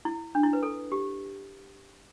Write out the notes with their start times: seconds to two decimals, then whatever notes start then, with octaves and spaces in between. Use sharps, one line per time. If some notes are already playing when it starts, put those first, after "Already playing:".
0.05 E4
0.35 D4
0.43 E4
0.53 B4
0.63 A4
0.92 G4